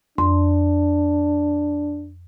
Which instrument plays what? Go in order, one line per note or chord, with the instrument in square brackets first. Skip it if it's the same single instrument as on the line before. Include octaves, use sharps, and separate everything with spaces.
[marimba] F2 C6 [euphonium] D4